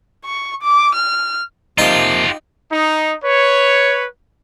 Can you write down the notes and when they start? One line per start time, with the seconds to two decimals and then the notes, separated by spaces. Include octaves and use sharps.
0.25 C#6
0.62 D6
0.95 F6
1.78 C3 F3 A#3 D#4 F4 G4
2.71 D#4
3.24 B4 C#5